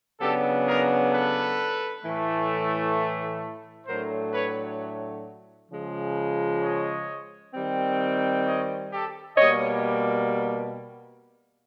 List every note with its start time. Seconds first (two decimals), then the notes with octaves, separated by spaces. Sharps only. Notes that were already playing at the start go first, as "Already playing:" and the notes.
0.20 C#3 F#3 B3 D4 G4 A4
0.65 G#4 A#4
1.11 A4 B4
2.03 A2 E3 A3
3.86 A2 F#3 A3 D4 A#4 C5
4.33 B4 C#5
5.70 C#3 F3 G#3
6.62 C#5 D#5
7.54 D#3 G3 C4
8.45 C#5 D#5
8.91 G4 A4
9.37 B2 G3 A#3 C#5 D#5